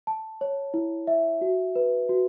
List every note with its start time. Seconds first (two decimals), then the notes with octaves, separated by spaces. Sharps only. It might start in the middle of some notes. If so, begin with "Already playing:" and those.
0.07 A5
0.41 C#5
0.74 E4
1.07 E5
1.41 F#4
1.75 B4
2.09 F#4